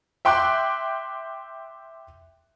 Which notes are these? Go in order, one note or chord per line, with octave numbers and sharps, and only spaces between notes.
E5 G5 C6 D6 F#6